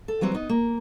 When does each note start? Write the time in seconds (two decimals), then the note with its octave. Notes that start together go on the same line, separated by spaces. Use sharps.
0.08 A4
0.21 E3 F#3 G3 C4
0.34 B3 D#4
0.49 A#3